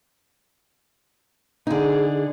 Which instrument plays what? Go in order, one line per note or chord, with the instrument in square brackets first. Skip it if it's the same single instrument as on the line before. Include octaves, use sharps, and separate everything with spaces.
[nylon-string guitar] D3 D#4 [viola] G#4